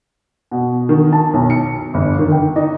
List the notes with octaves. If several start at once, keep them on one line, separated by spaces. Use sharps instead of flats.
B2
D#3
A5
B1
C#7
G1
D#3
G5
D#4